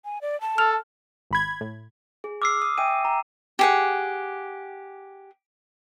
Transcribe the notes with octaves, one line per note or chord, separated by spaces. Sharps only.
G#5
D5
A5
A4 F6 F7
G#1 B5 G#6
A2
G#4
D6 E6 F6 C7
D#6
E5 G5 G#5 D#7
A#5
G4 G#4 F#5